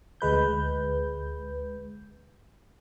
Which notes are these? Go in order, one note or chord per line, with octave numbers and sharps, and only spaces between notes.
D2 G#3 B4 G6